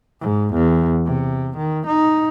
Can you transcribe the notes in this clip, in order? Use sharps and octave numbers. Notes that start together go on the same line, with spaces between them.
G#2
E2
C3
D#3
D#4